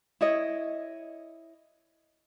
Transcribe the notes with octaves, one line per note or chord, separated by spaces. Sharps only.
E4 C#5 D#5